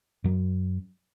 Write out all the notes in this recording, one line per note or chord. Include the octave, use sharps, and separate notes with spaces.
F#2 F#3